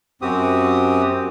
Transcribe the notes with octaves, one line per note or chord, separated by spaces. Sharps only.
F#2 C4 F#4 G4 D#6